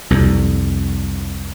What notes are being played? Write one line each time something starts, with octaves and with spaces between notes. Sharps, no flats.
C2 F2